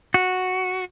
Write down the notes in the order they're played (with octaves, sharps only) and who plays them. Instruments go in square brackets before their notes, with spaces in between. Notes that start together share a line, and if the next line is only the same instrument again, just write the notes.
[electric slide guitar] F#4